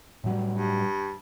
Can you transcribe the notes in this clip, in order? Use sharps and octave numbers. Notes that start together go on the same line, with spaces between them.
A2 F#3 G3
G2